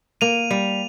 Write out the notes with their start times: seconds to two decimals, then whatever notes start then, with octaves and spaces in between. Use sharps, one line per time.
0.21 A#3 D#7 F7
0.51 G3